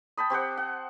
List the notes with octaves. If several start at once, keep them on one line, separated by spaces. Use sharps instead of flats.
G5 A5 B5 D#6
C4 G4 C5 F#5
F#5